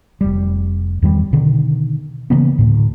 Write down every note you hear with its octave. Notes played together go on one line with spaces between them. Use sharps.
F1 G3
E2 D#3 G3
B2 D3 D#3
C#3 E3 A#3 B3
D2 A2